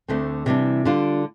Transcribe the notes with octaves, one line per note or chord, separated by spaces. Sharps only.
D2 D3 A3 C4
C3 E3 G3 D4
D3 G3 D4 F4